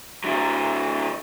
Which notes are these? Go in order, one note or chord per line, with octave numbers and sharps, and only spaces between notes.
D3 F#3